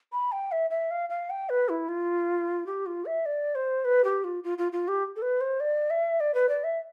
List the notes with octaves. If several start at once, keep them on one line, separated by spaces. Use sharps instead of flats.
B5
G5
E5
E5
F5
F5
G5
B4
E4
F4
G4
F4
E5
D5
C5
B4
G4
F4
F4
F4
F4
G4
A4
B4
C5
D5
E5
D5
B4
D5
E5